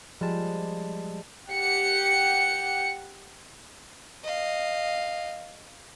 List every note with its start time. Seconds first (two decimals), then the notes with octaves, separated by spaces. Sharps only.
0.21 F3 G3 G#3 A5
1.50 G4 F#5 C#7
4.23 D#5 F5